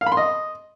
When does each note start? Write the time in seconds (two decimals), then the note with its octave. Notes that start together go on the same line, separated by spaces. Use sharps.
0.01 F5
0.06 B5
0.12 C6
0.17 D#5